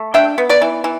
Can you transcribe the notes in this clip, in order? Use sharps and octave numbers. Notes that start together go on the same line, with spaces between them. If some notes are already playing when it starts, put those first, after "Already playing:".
Already playing: A3
D4 E5 G5
B3
B4 D5
E3
E3